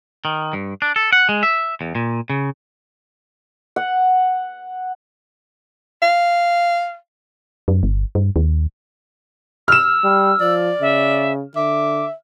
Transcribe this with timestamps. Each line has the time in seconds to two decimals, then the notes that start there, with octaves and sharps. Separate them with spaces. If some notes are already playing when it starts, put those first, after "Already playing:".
0.25 D#3
0.53 G2
0.82 D4
0.96 A4
1.13 F#5
1.29 G#3
1.43 E5
1.81 E2
1.95 A#2
2.30 C#3
3.76 F#5
6.02 F5
7.68 F#2
7.83 G1
8.15 G2
8.36 D#2
9.68 E6 F6 E7
10.04 G3
10.41 F3 D5
10.82 C#3 E5
11.56 D3 E5 D6